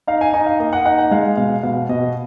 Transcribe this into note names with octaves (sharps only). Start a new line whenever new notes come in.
D#4 F5
G#5
D#4 G#5
F5
A#3 D#5
F#5
D#4 F#5
F#5
G#3 F5
B2 F5
B2 F5
B2 D#5